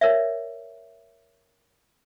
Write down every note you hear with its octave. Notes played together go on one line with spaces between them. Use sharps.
A#4 C#5 D5 E5